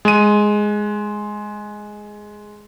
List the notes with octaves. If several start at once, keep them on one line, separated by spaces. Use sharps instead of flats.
G#3 D#7